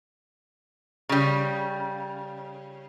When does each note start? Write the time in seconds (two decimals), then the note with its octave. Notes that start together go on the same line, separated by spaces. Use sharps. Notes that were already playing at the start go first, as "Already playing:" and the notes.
1.09 C#3 G3